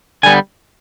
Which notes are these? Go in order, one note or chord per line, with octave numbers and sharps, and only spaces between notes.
D3 G3 B3 G#5